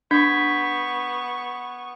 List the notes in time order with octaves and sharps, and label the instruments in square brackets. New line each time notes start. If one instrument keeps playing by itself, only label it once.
[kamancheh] B3 C#6 [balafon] D4 [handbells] G6 G#6 B6